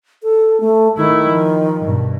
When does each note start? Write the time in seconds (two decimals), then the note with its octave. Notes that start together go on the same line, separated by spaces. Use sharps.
0.23 A4
0.60 A3
0.97 D#3 A3 E4
1.30 F3
1.82 G2 B2